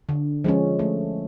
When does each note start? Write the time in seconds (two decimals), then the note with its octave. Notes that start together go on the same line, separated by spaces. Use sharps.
0.09 D3
0.44 F3 G#3 C#4
0.79 A3